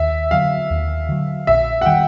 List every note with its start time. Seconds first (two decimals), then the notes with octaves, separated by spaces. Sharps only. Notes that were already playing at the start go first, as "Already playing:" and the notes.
Already playing: D#2 E5
0.31 D3 F#3 F5
0.70 D#2
1.09 D3 F#3
1.47 A#1 E5
1.81 F#5
1.86 D#3 G3 G5